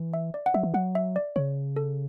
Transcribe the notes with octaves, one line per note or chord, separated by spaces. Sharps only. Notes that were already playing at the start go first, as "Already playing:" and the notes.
Already playing: E3
E5
D5
F#5
F#3 E5
E3
F#3 F#5
E5
D5
C#3 C#5
A4